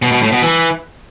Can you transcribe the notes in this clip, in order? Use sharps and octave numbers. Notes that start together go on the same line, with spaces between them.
B2
B2
A2
B2
E3